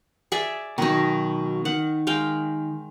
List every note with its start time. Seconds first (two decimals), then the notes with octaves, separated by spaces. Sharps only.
0.32 G#4 D5 E5
0.78 B2 D#3 F#3 D#4
1.65 D#3 F#5
2.07 G#3 F5 G5